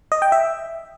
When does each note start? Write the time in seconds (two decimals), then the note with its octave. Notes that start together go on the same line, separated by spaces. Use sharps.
0.12 D#5
0.22 G5
0.32 E5